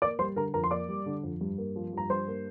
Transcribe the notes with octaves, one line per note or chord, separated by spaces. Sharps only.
A#3 D5 D6
G3 C5 C6
D3 A#4 A#5
F2 A#4 A#5
C6
A#3 D5 D6
G3
D3
F2
G2
A#3
F3
G2 A#5
G2 C5 C6
A#3